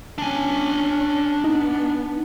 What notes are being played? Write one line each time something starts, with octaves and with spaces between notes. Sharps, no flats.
C#4 D4 G#5
B3 D#4